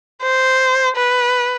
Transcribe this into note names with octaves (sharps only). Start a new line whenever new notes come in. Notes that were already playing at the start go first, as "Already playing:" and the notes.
C5
B4